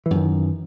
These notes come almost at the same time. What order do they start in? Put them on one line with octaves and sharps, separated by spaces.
E3 F#2 D#3